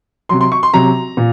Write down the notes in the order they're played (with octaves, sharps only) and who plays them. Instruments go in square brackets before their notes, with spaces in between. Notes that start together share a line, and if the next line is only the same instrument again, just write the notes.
[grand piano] C3 F#3 C6
C6
C#6
C6
C3 F#3 A#5
A#2